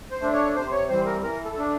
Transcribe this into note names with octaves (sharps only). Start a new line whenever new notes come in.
C5
A3 D4
C#5
C3 C5
C#5
E3 G3 C4 C5
A#4
E3 A#4
A4
A3 D4